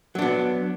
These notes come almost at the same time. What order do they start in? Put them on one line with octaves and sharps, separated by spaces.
F#3 D4 B3